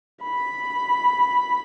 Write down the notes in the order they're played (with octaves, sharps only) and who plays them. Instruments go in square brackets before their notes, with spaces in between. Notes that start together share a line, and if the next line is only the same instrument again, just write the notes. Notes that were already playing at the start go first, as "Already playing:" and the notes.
[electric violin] B5